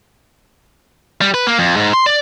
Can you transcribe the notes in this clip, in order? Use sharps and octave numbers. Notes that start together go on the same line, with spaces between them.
G3
B4
A#3
F2
G#2
C6
D5